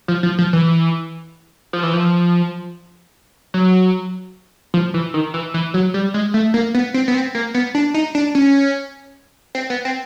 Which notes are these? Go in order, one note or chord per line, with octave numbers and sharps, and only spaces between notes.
F3
F3
F3
E3
F3
E3
F3
F#3
F3
E3
D#3
E3
E3
F#3
G3
G#3
A3
A#3
B3
C4
B3
C4
A#3
B3
D4
D#4
D4
C#4
C4
B3
C4